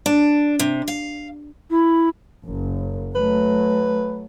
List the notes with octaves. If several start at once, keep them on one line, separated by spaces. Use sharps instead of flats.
D4
C3
F5
E4
F#1 F#2
F#3 A3 B4